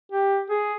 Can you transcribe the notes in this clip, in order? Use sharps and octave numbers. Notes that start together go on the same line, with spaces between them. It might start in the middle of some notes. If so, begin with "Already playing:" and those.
G4
G#4